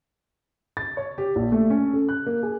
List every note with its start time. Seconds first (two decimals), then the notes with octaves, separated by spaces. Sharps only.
0.77 A6
0.97 C#5
1.18 G4
1.36 A#1
1.52 A3
1.70 C#4
1.93 A4
2.09 F#6
2.26 A#3
2.43 G#4